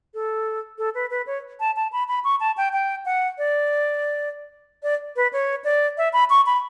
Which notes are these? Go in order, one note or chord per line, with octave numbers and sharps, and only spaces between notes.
A4
A4
B4
B4
C#5
A5
A5
B5
B5
C#6
A5
G5
G5
F#5
D5
D5
B4
C#5
D5
E5
B5
C#6
B5